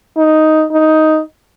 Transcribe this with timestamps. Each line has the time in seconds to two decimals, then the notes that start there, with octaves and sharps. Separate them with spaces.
0.17 D#4
0.71 D#4